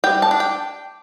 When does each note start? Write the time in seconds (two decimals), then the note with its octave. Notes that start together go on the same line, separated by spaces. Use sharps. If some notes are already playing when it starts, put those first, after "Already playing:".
0.04 G3 G5
0.22 A5
0.31 D4
0.40 G5